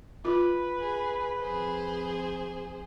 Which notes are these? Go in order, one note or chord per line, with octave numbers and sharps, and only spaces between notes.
F4 B4
G#4
F2 G#4 C5